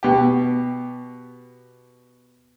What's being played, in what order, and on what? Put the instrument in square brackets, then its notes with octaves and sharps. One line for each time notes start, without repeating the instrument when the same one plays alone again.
[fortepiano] B2 G4